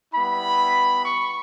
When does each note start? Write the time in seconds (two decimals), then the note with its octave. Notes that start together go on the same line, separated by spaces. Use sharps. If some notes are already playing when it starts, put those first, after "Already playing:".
0.13 G3 B3 E4 B5
1.04 C#6